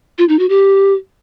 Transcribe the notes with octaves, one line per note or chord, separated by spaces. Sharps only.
F4
D#4
F#4
G4